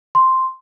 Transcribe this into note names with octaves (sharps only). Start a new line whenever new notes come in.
C6